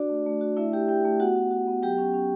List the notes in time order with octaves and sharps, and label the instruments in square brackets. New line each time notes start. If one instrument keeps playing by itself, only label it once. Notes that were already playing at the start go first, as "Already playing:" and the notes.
Already playing: [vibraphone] D4 F#4 D5
A3
A3
F#4
A3 E4 E5
E4 G4 G5
A3 G4 G5
A3
B3 F#4 F#5
F#4
F#4
B3
F#3 G4 G5
C#4
C#4